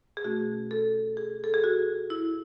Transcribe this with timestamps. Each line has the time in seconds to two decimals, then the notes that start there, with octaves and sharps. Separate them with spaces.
0.17 G#4
0.24 B2 A3 C#4 F#4
0.71 A4
1.17 G#4
1.44 A4
1.54 G#4
1.64 F#4
2.10 E4